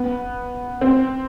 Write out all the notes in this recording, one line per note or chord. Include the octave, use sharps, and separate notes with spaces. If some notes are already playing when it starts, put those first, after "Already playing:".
Already playing: B3
C4